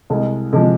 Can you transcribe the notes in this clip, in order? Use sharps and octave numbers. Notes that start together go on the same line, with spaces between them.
C2 G#3
C3 F3 G#3